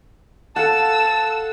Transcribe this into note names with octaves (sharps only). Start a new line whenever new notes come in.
A4 F5 F#5 A5 E6